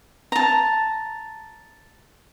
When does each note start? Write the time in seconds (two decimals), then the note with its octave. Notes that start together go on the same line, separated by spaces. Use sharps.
0.32 A5 A#5